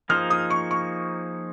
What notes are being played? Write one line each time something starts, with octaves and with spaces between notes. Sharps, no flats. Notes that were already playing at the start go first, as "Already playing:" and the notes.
F3 A#3 D#4 G#4 C5 F6
D#6
C#6
C#6